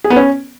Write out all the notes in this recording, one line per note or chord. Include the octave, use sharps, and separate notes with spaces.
G#4
B3
C#4